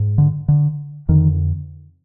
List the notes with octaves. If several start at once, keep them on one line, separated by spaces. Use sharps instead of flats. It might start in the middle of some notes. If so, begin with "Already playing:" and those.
Already playing: G#2
D3
D3
F2 D3 D#3